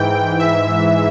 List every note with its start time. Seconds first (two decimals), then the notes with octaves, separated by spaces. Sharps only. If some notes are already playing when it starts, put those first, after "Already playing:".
Already playing: G#2 E3 G5
0.39 E5